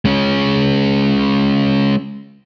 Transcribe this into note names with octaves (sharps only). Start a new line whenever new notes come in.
G#3 C#4